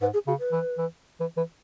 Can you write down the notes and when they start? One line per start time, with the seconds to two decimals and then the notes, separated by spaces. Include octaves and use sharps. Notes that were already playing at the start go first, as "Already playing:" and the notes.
0.01 G#2 B4
0.14 G#4
0.27 C#3 F#4
0.39 B4
0.52 E3
0.78 E3
1.20 E3
1.37 E3